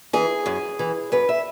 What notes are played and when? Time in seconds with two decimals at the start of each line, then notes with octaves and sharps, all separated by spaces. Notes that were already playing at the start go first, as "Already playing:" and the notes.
0.13 E3 G#4
0.46 F#2
0.79 E3
1.12 F#2 B4
1.29 E5